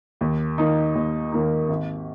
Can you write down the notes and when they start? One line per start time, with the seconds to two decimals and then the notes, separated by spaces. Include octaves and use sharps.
0.21 D#2
0.58 D#3 A#3 D#4
0.95 D#2
1.32 D#3 A#3 D#4
1.69 G#1